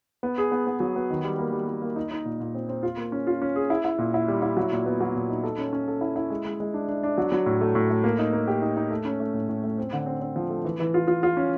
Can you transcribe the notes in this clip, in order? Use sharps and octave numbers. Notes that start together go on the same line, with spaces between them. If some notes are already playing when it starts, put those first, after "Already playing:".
B3
G#4
B3
B3
F#3
B3
D#3
G3
A#3
G3
G3
A#3
D#4
D#4
A#2
A#2
C4
C4
F4
A#3
C#4
F4
C#4
G#4
E4
E4
A#2
E4
G3
E4
F#3
A#2
B3
F#3
A#2
D#4
A4
C#4
C#4
A4
E4
E4
G#3
G#3
G#3
D4
D4
D4
F#3
F#3
A2
A3
A2
A3
A#3
D#4
A#3
G4
D#4
D#4
A3
C#4
A3
A2
A2
A3
C4
D3
C4
C4
F3
A3
E3
E3
F4
F4
F4
C#4